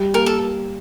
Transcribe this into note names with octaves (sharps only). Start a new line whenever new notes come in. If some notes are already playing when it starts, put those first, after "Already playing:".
Already playing: G3
A#3 A#4
A4